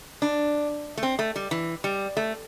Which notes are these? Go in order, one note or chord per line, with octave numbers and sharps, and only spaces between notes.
D4
A3
C4
A3
G3
E3
G3
A3